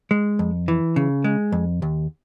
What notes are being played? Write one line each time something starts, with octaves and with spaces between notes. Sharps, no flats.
G#3
F2
E3
C#3
G#3
F2
D#2